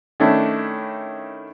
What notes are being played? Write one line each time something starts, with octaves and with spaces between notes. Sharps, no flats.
D#3 A3 C#4 D4 E4